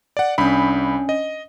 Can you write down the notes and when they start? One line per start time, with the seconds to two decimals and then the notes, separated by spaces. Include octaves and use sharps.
0.17 D5 F#5
0.38 C2 C#4 D4 B5
1.09 D#5